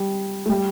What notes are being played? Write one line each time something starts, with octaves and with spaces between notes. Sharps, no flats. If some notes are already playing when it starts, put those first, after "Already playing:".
Already playing: G3
A3
G3